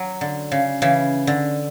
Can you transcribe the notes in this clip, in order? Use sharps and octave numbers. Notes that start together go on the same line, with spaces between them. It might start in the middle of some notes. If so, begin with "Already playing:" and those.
Already playing: F#3
D3
C#3
C#3 E3
D3